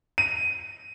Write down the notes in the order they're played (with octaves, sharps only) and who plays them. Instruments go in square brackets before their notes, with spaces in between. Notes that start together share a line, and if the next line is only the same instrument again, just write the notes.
[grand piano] D#7